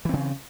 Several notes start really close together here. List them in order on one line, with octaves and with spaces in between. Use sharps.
E3 C4 C#3